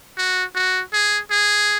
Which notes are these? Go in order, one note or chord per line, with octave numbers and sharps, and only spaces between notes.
F#4
F#4
G#4
G#4